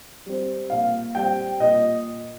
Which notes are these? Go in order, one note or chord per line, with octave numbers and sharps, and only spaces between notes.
G3 C4
A#2 F5
G3 C4 G5
A#2 D#5